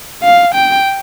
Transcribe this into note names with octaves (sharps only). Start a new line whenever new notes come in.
F5
G5